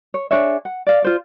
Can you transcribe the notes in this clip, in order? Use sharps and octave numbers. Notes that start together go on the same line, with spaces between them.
C#5
D4 G#4 C#5 E5
F#5
D5 F5
F4 C5 D5